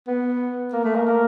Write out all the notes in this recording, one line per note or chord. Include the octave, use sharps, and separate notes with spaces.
B3
A#3
A3
A#3
A#3